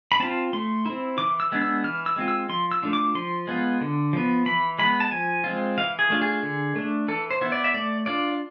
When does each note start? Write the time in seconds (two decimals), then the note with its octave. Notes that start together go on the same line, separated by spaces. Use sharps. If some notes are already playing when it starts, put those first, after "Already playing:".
0.12 B5
0.20 C4 F4 A5
0.53 A3 C6
0.86 C4 E4
1.18 E3 D6
1.40 E6
1.52 G#3 B3 D4
1.62 E6
1.84 E3 F6
2.06 E6
2.16 G#3 C4 F4
2.28 E6
2.49 F3 C6
2.72 E6
2.83 A3 D4 F4
2.93 D6
3.15 F3 C6
3.47 G#3 B3 F4
3.81 D3
4.13 F3 B3
4.46 E3 B5
4.79 G#3 B3 B5
5.00 A5
5.11 F3 G#5
5.44 G#3 C4 F4
5.78 E3 F5
5.99 G#4
6.10 A3 D4 F4
6.22 G#4
6.43 D3
6.76 A3 D4
7.08 E3 A4
7.31 C5
7.41 B3 E4
7.52 D5
7.64 E5
7.74 A3 D5
8.06 D4 F4 D5